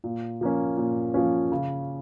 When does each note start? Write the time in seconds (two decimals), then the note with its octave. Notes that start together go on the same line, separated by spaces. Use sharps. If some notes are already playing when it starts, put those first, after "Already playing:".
0.04 A#2
0.41 F3 A#3 C#4
0.77 A#2
1.14 F3 A#3 C#4
1.52 C#3